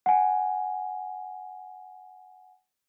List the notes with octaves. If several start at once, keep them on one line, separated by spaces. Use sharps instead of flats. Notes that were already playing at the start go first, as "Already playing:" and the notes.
F#5 G#5